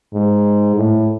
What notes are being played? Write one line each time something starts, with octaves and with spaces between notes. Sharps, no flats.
G#2
A2